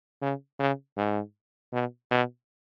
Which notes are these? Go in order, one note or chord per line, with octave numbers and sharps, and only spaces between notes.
C#3
C#3
G#2
B2
B2